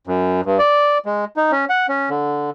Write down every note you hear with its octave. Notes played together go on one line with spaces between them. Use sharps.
F#2
G2
D5
G#3
D#4
C#4
F#5
C#4
D3